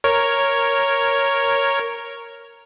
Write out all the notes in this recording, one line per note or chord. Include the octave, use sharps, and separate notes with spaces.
A#4 C#5